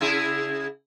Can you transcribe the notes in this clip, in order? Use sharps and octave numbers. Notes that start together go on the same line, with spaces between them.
C#3 E4 G#4